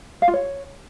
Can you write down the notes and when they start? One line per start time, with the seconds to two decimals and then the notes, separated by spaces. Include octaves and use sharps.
0.22 F5
0.28 F4
0.33 C#5